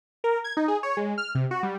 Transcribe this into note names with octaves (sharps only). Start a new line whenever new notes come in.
A#4
G#6
D#4
G#4
C#5
G#3
F6
C3
F#4
G3